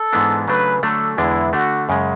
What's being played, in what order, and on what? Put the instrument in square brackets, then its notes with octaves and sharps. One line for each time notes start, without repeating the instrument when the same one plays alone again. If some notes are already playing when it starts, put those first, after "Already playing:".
Already playing: [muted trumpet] A4
[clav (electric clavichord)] G#2 E3 G#3 B3 D4
[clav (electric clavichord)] C#3 F#3 A3 D4 [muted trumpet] B4
[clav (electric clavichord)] D3 F#3 A3 D4 [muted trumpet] A4
[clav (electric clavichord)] E2 D3 G#3 D4 [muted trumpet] E4
[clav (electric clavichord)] D3 A3 D4 [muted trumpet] F#4
[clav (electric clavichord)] F#2 C#3 G#3